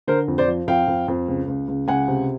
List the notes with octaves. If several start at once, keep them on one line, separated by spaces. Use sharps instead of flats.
D3 A#4 C5
F2
C5 D5
F3
F2 F5 G5
F2
F2
C#2
C#2
C#2
C#2 F#5 G#5
C3